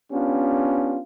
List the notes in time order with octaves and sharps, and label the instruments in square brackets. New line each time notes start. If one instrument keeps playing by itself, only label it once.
[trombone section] B3 C#4 D4 F4 G4